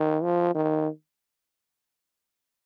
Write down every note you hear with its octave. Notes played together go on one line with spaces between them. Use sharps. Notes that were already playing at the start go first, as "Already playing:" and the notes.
Already playing: D#3
F3
D#3